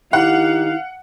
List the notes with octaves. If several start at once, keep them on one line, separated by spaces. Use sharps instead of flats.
D#3 D#4 E4 G4 F5 F#5